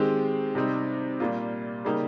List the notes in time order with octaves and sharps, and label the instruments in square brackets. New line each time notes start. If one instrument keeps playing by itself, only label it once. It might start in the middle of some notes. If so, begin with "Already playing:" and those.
Already playing: [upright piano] D#3 G#3 C4 G4
C3 G3 C4 D#4
A#2 G3 A#3 F4
C#3 G3 A#3 D#4 G4